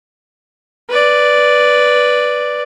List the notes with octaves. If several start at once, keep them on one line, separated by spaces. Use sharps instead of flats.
B4 D5